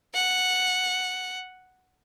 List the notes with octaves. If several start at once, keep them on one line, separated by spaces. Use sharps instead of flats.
F#5